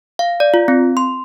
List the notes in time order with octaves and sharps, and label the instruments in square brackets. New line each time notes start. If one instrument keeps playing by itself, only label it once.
[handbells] F5
D5
F4
C4
C6